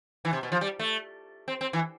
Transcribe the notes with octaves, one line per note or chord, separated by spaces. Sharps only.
E3
C3
B2
F3
G3
A3
C4
C4
E3